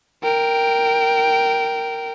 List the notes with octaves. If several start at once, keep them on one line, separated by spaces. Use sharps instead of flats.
A#4 G5